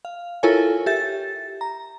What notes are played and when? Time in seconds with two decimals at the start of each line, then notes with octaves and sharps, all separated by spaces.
0.05 F5
0.43 E4 F4 A4 A#4 C#5 G#5
0.86 G4 E5 A6
1.61 A#5